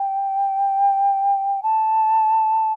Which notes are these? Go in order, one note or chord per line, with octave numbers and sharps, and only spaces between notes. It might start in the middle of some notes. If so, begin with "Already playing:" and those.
Already playing: G5
A5